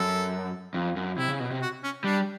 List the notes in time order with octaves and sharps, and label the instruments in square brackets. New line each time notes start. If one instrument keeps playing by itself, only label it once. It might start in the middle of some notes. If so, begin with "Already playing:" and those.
Already playing: [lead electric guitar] F#2 [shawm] A4
[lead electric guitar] F2
F#2
[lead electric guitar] C3 [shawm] E4
[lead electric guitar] C#3
B2
C3
[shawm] F#4
C#4
[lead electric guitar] G3 [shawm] D4